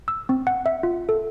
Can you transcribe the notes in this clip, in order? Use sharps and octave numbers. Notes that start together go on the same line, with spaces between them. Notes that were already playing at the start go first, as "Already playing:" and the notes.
E6
C4
F#5
E5
F4
A4